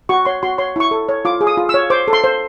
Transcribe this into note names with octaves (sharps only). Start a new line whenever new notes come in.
F#4 C#6
C#5 C6
F#4 C6
C#5 C6
E4 C#6
A4
C#5
F4 D6
G#4
D#6
F4
E6
C#5
C5 D6
A4
C6
C5